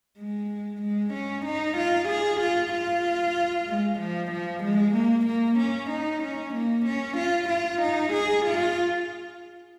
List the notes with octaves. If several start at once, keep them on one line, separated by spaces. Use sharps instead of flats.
G#3
G#3
C#4
D#4
F4
G#4
F4
F4
G#3
F3
F3
G#3
A#3
A#3
C#4
D#4
C#4
A#3
C#4
F4
F4
D#4
G#4
F4